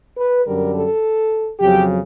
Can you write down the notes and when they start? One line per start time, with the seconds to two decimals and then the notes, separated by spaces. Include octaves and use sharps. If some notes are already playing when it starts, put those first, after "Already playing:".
0.17 B4
0.45 F#2 D3 G3 A#4
0.74 A4
1.59 F2 C#3 F#3 G4